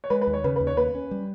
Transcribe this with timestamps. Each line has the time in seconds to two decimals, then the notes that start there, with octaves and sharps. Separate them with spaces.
0.04 C#5
0.10 G#3 B4
0.22 B4
0.27 D#2
0.34 C#5
0.44 C#3 B4
0.56 B4
0.60 D#2
0.67 C#5
0.77 A#3 B4
0.95 C#4
1.11 G3